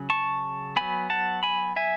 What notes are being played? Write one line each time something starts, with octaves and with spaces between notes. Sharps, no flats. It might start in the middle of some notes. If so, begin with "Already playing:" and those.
Already playing: C#3 F#3 C#4
A5 C#6
F#3 B3 G#5 B5
F#5 A5
G#5 B5
E5 G#5